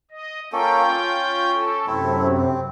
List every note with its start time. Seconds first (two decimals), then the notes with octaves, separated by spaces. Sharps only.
0.11 D#5
0.53 A#3 C#4 F4 A4 G5
0.89 C#4
1.53 A4
1.87 F#2 C3 A3 C4 E4
2.37 C4